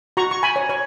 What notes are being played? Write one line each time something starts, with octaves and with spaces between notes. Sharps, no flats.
F#4 A#5 C#6
C#6
G#5 B5
C#5
C#5